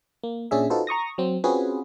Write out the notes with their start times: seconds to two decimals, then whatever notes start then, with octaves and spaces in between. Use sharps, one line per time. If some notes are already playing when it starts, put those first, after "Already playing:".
0.23 A#3
0.51 A#2 C#4 D4 G#4 E5
0.70 D#4 F4 F#4 A4 B4 C5
0.87 A#5 C#6 D#6 A#6
1.18 F#3 C4
1.44 C4 C#4 F4 F#4 G#4 B4